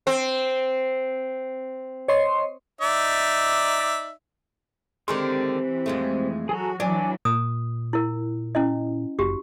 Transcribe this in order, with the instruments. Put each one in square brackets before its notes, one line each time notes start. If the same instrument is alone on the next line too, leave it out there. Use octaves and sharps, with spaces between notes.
[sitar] C4
[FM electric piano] C#5 D#5 C6
[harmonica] D#4 D5 E5
[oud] D3 D#3 G#3 [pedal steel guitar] C4 G4 C6
[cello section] E3
[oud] F2 G#3 A3
[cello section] F#3 F#4 [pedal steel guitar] G#4 A4 A#5
[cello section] E3 F#3 [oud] D4 [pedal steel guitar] C#5 G#5 D6
[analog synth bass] A#2 [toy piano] D#6
[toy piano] E4 A#4
C#4 E4 D#5
[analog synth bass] F#1 [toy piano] F#4 G4